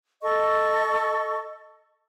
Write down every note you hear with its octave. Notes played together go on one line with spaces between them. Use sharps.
A4 D#5 C#6